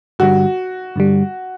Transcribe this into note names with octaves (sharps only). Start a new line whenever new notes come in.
G2 D3 G3 F#4
G2 D3 G3